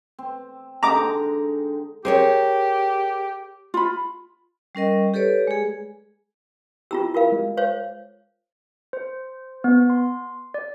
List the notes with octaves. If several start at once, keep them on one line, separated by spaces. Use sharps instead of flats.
C4
D3 G#3 D#4 A#5 D6
G4 G#4 A#4 C5 C#5
F4 B5
G3 C#4 A#4 D#5
G4 A4 B4 C#5 D5
G#3 G#4
C4 E4 F4 G4 A#5 E6
F4 A#4 F5
G#3
C5 C#5 F5
C5
B3
C6
D5